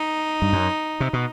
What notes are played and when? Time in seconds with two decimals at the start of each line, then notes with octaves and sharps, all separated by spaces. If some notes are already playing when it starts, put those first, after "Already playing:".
Already playing: D#4
0.42 G2
0.53 F#2
1.00 C3
1.13 B2